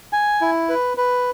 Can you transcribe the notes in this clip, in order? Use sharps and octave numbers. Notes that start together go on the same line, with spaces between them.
G#5
E4
B4
B4